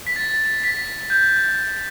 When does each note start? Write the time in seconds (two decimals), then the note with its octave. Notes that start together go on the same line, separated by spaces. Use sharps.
0.07 B6
0.16 A6
0.64 B6
1.10 G6